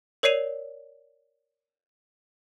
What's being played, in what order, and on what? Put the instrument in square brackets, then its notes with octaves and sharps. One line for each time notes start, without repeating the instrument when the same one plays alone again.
[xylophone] A#4 C#5 D5 C7 D#7 F7